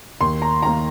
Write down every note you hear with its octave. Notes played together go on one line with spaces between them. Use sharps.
D#2 C6
A#5
D#3 A#3 A#5